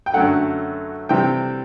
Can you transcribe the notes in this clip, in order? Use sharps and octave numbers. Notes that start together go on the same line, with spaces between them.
G5
F#2 D3 F#3 A3 F#5
C3 E3 G3 G5